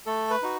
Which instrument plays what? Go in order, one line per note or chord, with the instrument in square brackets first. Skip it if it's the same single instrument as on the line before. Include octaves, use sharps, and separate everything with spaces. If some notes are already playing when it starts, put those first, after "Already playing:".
[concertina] A3 A4
B4
D#4 F#4